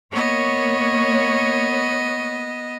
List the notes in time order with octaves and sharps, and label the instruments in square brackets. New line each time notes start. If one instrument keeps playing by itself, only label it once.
[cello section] A#3 C#5 [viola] B3 D#5